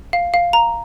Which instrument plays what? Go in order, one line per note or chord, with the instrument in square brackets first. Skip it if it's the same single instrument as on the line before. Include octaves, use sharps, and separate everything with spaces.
[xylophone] F5
F5
A#5